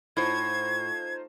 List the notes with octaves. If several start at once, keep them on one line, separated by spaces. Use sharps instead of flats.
A2 D#4 F4 C5 G#6